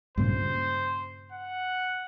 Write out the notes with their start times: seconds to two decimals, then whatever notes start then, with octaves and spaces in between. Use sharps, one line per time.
0.17 G2 A#2 C#3 C5
1.32 F#5